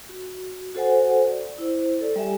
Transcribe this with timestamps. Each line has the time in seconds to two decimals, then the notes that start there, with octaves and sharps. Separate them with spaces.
0.09 F#4
0.75 F#4 A4 C5 F#5 G#5
1.30 D5
1.58 E4 C5
2.01 A4 D5
2.16 G3 G4 E5 G#5